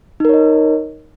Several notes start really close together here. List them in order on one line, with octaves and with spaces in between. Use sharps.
D#4 A#4 C#5 D#5